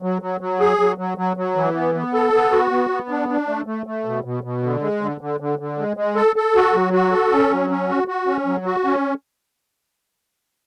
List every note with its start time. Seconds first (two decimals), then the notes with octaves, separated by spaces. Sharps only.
0.02 F#3
0.22 F#3
0.41 F#3
0.60 G#4
0.79 F#3
0.98 F#3
1.18 F#3
1.37 F#3
1.56 E3
1.74 B3
1.95 B3
2.13 A4
2.33 B3
2.52 F#4
2.71 B3
2.90 B3
3.09 D4
3.29 D4
3.48 A3
3.66 A3
3.86 A3
4.05 B2
4.24 B2
4.43 B2
4.63 D3
4.82 G#3
5.01 D3
5.21 D3
5.40 D3
5.59 D3
5.78 G#3
5.97 G#3
6.16 A4
6.36 A4
6.55 F#4
6.74 F#3
6.93 F#4
7.12 A4
7.32 C#4
7.51 F#3
7.70 C#4
7.89 F#4
8.08 F#4
8.27 C#4
8.46 F#3
8.66 F#4
8.85 C#4